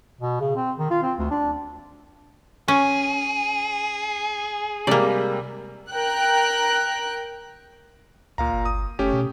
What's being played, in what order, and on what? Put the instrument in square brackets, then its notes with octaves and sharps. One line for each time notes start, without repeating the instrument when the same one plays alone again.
[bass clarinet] B2
C#3
C4
D#3
F4
C4
D2
D4
[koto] C#4 [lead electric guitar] G#4
[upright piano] C3 G3 G#3 [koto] A#3 D5
[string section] A#4 G5 F#6
[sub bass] C#2 [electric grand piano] A#2 F5 A#5
[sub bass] G1
[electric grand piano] D#6
[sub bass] F#1 [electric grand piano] A3 C#4 G4
[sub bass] B2